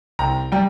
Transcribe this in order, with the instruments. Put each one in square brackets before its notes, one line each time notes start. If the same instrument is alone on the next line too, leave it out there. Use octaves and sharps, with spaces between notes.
[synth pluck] C2 [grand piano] G5 A#5
[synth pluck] G3 [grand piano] G5 A#5